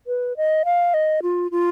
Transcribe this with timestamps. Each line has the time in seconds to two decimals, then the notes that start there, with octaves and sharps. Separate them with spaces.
0.07 B4
0.37 D#5
0.65 F5
0.94 D#5
1.23 F4
1.51 F4